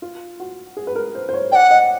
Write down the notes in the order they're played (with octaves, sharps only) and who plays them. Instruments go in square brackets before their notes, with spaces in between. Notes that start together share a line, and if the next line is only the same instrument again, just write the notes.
[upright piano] F4
F#4
G#4
B4
A#4
C5
C5
C#5
[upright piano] D5 [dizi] F#5 G5
[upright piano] D#5